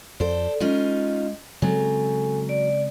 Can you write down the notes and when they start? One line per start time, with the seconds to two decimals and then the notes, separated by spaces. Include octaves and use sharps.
0.20 F2 A4 C5 D5
0.60 G#3 C#4 D#4 F4 D#5
1.62 C#3 F#3 G#3 C4 A4 G#5
2.49 D5